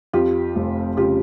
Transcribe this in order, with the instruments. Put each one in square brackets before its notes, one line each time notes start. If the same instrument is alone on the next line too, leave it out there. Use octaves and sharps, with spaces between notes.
[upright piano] F2 F4 G4
F1
C#3 F4 G4